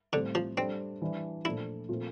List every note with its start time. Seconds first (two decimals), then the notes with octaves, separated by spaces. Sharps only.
0.13 A2 D3 G3 C4
0.35 F3
0.57 G3 C4 D4 A4 C5
1.02 E3 G3 D4
1.45 A#2 F3 A3 D4 E4
1.89 A#2 F3 A3 C4 F4